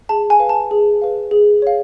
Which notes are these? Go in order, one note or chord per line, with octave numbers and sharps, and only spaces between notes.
G#4 A5
G#5
B4 F5
A5
G#4
B4 F5
G#4
C#5 F5